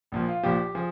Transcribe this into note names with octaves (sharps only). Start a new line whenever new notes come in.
A#1 A#2 F3
F4
A#1 A#2 F3 G4
F3 G#4